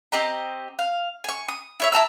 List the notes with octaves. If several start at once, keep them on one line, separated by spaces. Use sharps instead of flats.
C4 G4 D#5 A#5
F5
G#5 C#6
D#6
E4 C#5 E5
E4 A5 A#5 E6